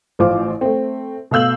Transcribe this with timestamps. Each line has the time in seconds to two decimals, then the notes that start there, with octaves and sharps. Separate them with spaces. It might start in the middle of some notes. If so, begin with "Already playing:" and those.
0.19 A1 F3 F4 C5 D6
0.61 A3 C4
1.31 B2 A3 F5 E6 G6 F#7